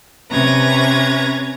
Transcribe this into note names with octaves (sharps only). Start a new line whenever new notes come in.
C3 C#4 B4 A#5 G#6